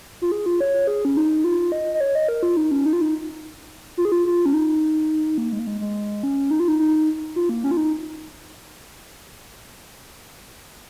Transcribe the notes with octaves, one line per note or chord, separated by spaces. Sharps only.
F4
G#4
F4
C#5
G#4
C#4
D#4
F4
D#5
D#5
C#5
D#5
A#4
F4
D#4
C#4
D#4
F4
D#4
F4
G#4
F4
F4
C#4
D#4
A#3
G#3
A#3
G#3
G#3
C#4
D#4
F4
D#4
D#4
F4
A#3
C#4
F4
D#4